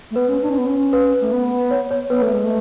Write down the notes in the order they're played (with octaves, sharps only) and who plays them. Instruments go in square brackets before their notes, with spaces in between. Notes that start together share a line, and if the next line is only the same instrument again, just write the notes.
[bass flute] A3
[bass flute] B3 [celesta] B4
[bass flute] C#4
D4
C#4
B3
C#4
[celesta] B4
[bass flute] A3
B3
[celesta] C#5
C#5
[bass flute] B3 [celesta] B4
[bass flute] A3
G#3
A3